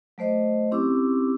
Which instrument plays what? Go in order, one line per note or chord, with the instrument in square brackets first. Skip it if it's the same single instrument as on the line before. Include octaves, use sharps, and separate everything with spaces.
[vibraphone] F#3 A3 C5 D#5
C4 C#4 E4 G4 D6 E6